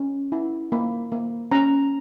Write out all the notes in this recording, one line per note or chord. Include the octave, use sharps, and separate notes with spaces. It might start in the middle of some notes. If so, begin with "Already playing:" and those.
Already playing: C#4
E4
A#3 B5
A#3
C#4 A#5